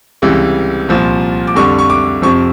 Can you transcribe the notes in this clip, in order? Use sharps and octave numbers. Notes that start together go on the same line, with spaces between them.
C#2 C3 E3 G3
C2 A#2 F3
D6
F2 D3 G3 C#6
C#6
D6
F2 C3 F3 C#6